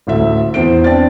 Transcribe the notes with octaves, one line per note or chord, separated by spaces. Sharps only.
A1 D2 E5
E2 C5 D7
C4 D4 A6